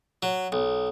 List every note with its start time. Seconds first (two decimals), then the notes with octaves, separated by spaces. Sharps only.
0.23 F#3
0.52 B1